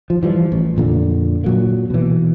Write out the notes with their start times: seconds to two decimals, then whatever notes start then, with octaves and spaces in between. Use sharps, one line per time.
0.10 F3
0.23 E3 F3 G3
0.52 A1
0.77 F2 A#2 D3
1.44 A#2 F#3 A#3
1.90 B2 E3